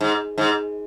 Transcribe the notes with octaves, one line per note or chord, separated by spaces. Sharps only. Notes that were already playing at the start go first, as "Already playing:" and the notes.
G#2
G#2